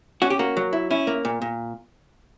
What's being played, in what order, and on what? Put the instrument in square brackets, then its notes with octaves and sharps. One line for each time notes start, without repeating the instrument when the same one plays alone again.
[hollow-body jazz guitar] C#4 F#4
G4
A#3 F#4
F#3
E4
C#4 E4
A#3
A#2
A#2